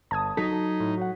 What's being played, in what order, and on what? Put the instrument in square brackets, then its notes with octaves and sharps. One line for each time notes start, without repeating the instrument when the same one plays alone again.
[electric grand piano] G1 G#6 [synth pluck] A5 D#6
[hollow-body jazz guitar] F#3 A4 [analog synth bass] D#4 [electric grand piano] B6
[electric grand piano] A2
F#4 C#5 F#5